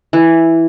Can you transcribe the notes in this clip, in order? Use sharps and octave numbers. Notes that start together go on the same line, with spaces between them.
E3